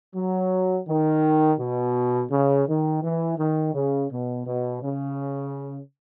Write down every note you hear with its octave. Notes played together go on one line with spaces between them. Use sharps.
F#3
D#3
B2
C#3
D#3
E3
D#3
C#3
B2
B2
C#3